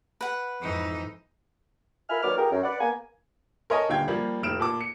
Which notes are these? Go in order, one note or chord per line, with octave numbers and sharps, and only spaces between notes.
B4 F#5
F2 G#2 E3 D#4
F4 A#4 E5 G#5 B5 F6
D#2 F#3 B3 D5 D6 F6
F4 G4 G#4 A#4
F#2
B4 D5 F#5
A#3 B3 G#5
A#4 C#5 D#5 G#5 A5
D#1 A#2 D3 F5 G5 G#6
F3 G3 A#3
F1 A2 F6 D7 E7
A#2 A5 D6
C#7